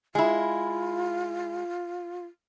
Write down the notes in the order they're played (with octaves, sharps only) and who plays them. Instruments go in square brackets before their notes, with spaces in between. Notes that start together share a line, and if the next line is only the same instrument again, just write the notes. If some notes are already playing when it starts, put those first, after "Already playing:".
[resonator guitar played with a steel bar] G#3 E4 [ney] F4